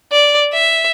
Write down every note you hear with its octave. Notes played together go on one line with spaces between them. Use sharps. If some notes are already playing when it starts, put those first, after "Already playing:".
D5
E5